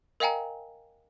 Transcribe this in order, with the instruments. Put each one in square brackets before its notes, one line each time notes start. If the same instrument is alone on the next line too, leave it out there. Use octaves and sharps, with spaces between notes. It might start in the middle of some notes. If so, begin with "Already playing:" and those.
[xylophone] A#4 D#5 F5 G5 G#5 A#5